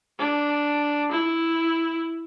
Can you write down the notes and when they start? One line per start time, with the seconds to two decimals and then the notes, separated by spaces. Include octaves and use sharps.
0.19 D4
1.12 E4